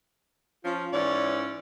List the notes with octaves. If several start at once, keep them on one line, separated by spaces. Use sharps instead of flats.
F3 C#4 F4
G#2 E3 C#4 D5